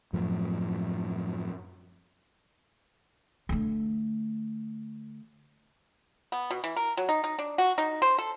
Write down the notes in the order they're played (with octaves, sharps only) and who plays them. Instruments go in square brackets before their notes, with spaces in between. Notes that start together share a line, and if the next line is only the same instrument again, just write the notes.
[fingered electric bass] F#2 A2 F3
[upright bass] D3 A3
[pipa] B3
B2
E3
A#4
F#3
D#4
D#4
D4
F#4
D#4
C5
A4